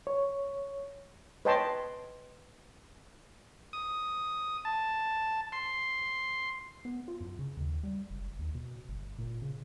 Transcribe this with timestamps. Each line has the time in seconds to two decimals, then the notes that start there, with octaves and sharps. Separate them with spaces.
0.07 C#5
1.45 B4 C#5 D#5 G5 A5 C6
3.73 D#6
4.65 A5
5.52 C6
6.85 B3
7.08 F4
7.21 F#2
7.39 C#3
7.57 D#2
7.83 G3
8.10 F#1
8.39 D#2
8.55 B2
8.89 G1
9.19 A#2
9.42 C#3